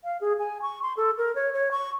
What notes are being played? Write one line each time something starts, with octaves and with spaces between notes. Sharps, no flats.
F5
G#4
G#5
C#6
C6
A4
A#4
C#5
C#5
C#6